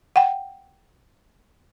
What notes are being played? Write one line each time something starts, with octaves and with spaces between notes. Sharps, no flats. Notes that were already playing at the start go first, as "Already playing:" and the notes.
F#5 G5